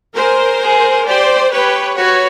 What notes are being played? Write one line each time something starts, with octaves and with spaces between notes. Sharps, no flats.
G#4 A#4 C5
G#4
G4 C5 D5
G4 B4 C#5
F#4 B4 C#5